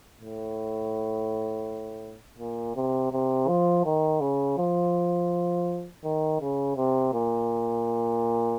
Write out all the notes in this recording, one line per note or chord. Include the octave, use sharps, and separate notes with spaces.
A2
A#2
C3
C3
F3
D#3
C#3
F3
D#3
C#3
C3
A#2